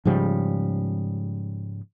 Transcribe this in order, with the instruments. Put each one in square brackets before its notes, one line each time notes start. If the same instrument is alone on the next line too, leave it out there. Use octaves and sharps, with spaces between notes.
[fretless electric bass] G#2 C#3 F3 G3